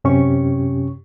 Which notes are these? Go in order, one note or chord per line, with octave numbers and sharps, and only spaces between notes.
F#2 C3 C#4 G4 C#6